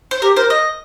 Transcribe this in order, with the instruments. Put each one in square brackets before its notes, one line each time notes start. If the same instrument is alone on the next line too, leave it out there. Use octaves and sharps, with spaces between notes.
[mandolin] C5
[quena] G4 [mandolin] A#4
[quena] A#4 [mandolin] C5
[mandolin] D#5